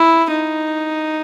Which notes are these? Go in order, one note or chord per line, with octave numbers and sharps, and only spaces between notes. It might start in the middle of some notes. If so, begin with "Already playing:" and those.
Already playing: E4
D#4